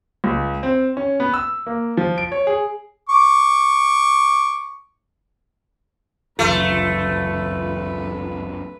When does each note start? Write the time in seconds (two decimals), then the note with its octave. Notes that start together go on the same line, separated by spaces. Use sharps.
0.24 C#2
0.63 C4
0.97 C#4
1.20 B3
1.34 E6
1.67 A#3
1.97 F3
2.18 D7
2.32 C#5
2.47 G#4
3.09 C#6 D6
6.39 G1 C#2 F#2 A3 F4 B4